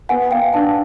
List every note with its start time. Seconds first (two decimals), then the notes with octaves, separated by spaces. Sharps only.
0.09 B3 F#5 G#5
0.31 B3 F5 G5
0.53 D4 G5 A5